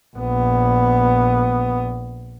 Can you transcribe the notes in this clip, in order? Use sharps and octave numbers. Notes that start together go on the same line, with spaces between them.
A#1 B3